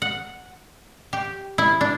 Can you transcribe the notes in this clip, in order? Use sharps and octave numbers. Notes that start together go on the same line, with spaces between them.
F#5
G4
E4
D4